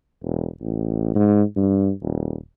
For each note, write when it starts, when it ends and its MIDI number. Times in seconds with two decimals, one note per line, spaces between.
0.23 0.48 28
0.61 1.13 33
1.15 1.42 44
1.56 1.91 43
2.02 2.36 27